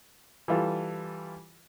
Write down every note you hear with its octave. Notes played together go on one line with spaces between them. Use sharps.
E3 G3 F4 A4